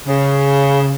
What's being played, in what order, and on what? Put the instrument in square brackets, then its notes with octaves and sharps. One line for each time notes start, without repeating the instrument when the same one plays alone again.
[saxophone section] C#3